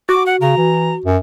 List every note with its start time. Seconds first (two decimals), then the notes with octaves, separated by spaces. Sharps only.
0.09 F#4 D6
0.26 F#5
0.41 C#3 A#5
0.57 E3
1.05 F#2